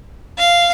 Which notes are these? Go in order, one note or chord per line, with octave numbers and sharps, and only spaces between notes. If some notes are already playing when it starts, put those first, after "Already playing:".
F5